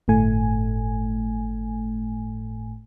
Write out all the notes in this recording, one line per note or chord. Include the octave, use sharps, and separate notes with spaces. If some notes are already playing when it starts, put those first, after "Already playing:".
G1 A2 A3 G#5